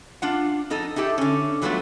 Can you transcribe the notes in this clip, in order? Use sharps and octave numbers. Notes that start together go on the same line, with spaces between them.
D4 F4 F#5
F2 D#4 A4 D#5
D#4 E4 G4 A4
D3 C#4
E3 F#3 G3 A3 B3 F4